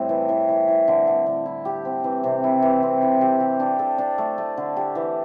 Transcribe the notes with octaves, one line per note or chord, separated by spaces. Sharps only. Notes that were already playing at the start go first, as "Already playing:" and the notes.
Already playing: A2 G3 A3 C4 E4
E3
E3
E3
E3
D3
D3
D3
E4
G4
C4
E3
C3
E4
E3
C4
E4
G4
G4
D4
A4
D4
A3
A3
D3
G4
E3